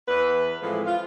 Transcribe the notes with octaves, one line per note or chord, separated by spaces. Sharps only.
E2 B4
A2 E3 F3 G#3 C4
F4